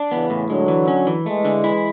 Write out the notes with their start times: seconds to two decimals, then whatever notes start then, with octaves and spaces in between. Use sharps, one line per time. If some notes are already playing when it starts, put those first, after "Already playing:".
Already playing: D4
0.12 C#3 E3 B3
0.30 A2
0.49 D3 F#3 G#3
0.68 E3
0.88 C#4
1.07 E3
1.26 E3 G#3 A3
1.45 D3
1.64 E4